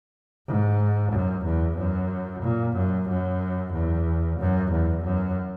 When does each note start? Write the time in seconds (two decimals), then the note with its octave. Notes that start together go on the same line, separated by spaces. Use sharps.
0.47 G#2
1.12 F#2
1.45 E2
1.78 F#2
2.43 A#2
2.76 F#2
3.09 F#2
3.73 E2
4.39 F#2
4.72 E2
5.04 F#2